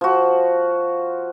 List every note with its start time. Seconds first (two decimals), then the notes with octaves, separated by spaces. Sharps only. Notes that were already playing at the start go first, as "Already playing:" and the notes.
0.01 F3 F#4